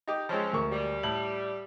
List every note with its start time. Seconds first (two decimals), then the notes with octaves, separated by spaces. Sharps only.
0.07 D#4 G4
0.29 F3 G#3 C4 C#4
0.53 D2 A#4 C#6
0.71 G3
1.03 A2 F#7